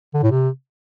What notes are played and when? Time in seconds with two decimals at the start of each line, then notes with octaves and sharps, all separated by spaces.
0.14 D3
0.23 A2
0.31 C3